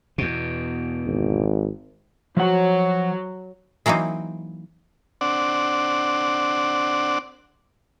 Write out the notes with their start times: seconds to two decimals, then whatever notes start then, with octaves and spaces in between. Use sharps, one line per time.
0.18 E2 B2
1.05 G#1
2.37 F3 F#3 F#5
3.86 E3 F#3 A#3 C4 D#4
5.21 C4 D4 D5 F#5